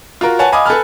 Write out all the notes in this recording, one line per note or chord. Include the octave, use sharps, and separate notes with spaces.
F4 F#4 A#4
B4 C#5 F#5 G#5 A5
D#5 F5 G#5 B5 D6 D#6
A4 B4 G#5 A5 B5 F6